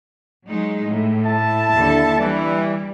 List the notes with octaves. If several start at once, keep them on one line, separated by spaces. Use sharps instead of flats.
F#3 G#3 D#4
A2
E4 E5 A5
D#2 D3 A4
E3 G3